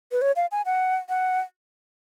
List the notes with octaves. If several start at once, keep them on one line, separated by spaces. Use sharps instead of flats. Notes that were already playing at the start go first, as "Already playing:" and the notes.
B4
C#5
F5
G#5
F#5
F#5